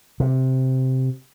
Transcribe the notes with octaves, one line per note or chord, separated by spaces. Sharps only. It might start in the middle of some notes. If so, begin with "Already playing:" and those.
C3